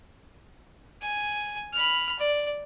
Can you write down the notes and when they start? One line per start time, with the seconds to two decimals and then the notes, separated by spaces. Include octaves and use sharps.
1.02 G#5
1.74 B5 F6
2.19 D5